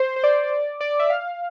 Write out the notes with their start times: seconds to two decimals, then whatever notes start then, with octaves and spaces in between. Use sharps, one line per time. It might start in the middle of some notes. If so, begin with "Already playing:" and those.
Already playing: C5
0.16 C5
0.24 D5
0.81 D5
0.91 D5
0.99 E5
1.10 F5